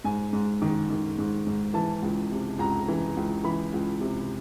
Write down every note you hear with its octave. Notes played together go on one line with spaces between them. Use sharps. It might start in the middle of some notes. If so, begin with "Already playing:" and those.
G#2 G#5
G#2
D#3
D#3
G#2
G#2
E3 A5
C#2
C3
C#2 A#5
E3
C#2
E3 B5
C#2
C3